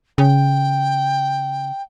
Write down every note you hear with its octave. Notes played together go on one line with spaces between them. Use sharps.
C#3 G5